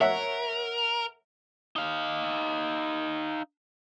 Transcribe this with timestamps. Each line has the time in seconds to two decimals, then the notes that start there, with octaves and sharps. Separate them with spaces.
0.01 A#4 C#5 E5 F#5
1.76 D#4 F5